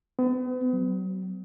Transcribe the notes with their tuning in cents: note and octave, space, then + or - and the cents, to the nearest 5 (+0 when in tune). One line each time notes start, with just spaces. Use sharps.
B3 +45
F#3 +25